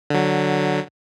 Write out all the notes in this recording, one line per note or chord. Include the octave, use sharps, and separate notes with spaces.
D3 F#3